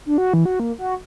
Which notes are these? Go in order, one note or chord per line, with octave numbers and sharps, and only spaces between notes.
D4
F#4
E3
F#4
A#3
F#4